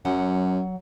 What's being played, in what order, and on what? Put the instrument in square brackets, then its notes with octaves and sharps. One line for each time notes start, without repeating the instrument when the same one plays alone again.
[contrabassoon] F#2 [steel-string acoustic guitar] F#3 F#5